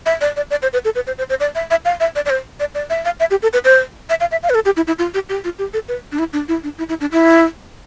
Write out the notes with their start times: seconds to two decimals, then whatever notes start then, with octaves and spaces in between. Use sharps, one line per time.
0.06 E5
0.21 D5
0.36 D5
0.51 D5
0.62 C5
0.73 B4
0.85 A4
0.95 B4
1.07 C5
1.18 C5
1.30 C5
1.40 D5
1.55 E5
1.71 E5
1.85 F5
2.00 E5
2.16 D5
2.26 D5
2.30 C5
2.60 D5
2.75 D5
2.90 E5
3.05 F5
3.20 E5
3.31 G4
3.43 A4
3.53 B4
3.65 C5
4.10 E5
4.20 F5
4.32 E5
4.43 F5
4.50 B4
4.55 A4
4.65 G4
4.77 E4
4.87 E4
4.99 F4
5.14 G4
5.29 G4
5.44 F4
5.59 G4
5.74 A4
5.88 B4
6.12 D4
6.19 E4
6.33 D4
6.48 E4
6.64 D4
6.78 E4
6.89 E4
7.01 D4
7.12 E4